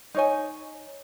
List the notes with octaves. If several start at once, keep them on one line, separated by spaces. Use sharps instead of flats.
D#4 C#5 G#5